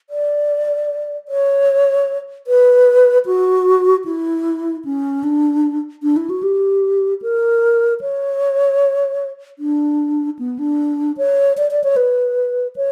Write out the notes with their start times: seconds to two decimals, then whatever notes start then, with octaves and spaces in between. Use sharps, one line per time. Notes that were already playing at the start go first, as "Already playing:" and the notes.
0.10 D5
1.28 C#5
2.47 B4
3.26 F#4
4.06 E4
4.85 C#4
5.24 D4
6.03 D4
6.16 E4
6.30 F#4
6.43 G4
7.22 A#4
8.01 C#5
9.59 D4
10.39 B3
10.59 D4
11.17 C#5
11.57 D5
11.71 D5
11.84 C#5
11.96 B4
12.76 C#5